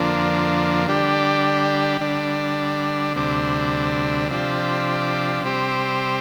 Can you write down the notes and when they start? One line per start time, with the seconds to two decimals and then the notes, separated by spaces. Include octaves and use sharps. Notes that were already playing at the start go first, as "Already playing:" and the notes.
Already playing: F2 D3 F3 A#3 D4
0.87 D3 G3 D4 G4
2.01 D3 G3 D4
3.15 D2 C3 G3 D4
4.29 C3 F3 D4 G4
5.43 C3 G3 C4 G4